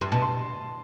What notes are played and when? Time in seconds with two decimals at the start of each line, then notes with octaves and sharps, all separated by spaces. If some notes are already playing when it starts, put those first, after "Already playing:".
0.01 G2 C6
0.12 B2 A5
0.22 C6